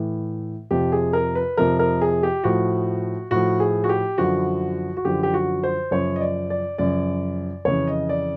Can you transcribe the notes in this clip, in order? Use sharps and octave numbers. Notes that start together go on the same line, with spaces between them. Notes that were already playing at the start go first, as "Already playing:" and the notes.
Already playing: A2 E3
F2 C3 F3 G4
G#4
A#4
B4
F2 C3 F3 A#4
A#4
G#4
G4
A2 F3 F#4
A2 F3 F#4
G#4
F#4
G4
F#2 D3 F3 F#4
F#4
F#2 D3 F3 G4
G4
F#4
C5
F#2 C#3 F3 C#5
D#5
D5
D5
F#2 C#3 F3 D5
F2 C#3 E3 C#5
D#5
D5